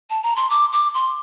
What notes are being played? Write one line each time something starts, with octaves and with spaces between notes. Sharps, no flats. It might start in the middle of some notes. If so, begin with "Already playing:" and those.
A5
A#5
C6
D6
D6
C6